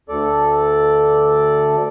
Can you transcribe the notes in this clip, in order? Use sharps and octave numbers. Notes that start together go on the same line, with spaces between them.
D2 A4 D5